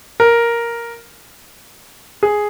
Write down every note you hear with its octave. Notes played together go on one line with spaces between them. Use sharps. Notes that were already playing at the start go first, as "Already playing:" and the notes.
A#4
G#4